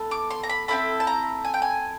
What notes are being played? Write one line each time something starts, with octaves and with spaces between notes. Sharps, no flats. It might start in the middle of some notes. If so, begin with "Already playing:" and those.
Already playing: B3 E4 A4
D6
C6
A#5
B5
C4 E4 A4 B5
A5
A#5
G#5
G5
G#5